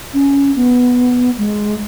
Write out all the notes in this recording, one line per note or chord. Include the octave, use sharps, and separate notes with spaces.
C#4
B3
G#3